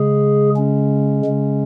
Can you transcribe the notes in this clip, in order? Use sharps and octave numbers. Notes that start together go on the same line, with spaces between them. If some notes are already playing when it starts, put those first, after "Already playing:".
Already playing: C#3 G#3 G#4
C#4
C#3 G#3